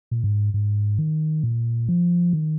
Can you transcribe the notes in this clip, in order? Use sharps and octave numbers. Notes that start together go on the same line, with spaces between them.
A#2
G#2
G#2
D#3
A#2
F3
D#3